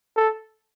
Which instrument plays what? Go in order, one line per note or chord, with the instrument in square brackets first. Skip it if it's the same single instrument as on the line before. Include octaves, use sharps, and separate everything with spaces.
[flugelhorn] A4